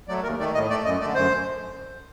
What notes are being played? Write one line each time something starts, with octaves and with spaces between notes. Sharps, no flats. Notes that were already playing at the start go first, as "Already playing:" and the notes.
F#3 A3 D5
D#2 A#4
D#3 A3 D5
A2 D#5
A3 D5
F#2 D#5
D3 A3 D5
F#2 C5